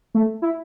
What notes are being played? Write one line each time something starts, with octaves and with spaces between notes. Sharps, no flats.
A3
E4